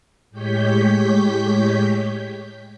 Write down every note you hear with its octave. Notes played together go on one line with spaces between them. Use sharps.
A2 G#3 G4 C#5 G6 B6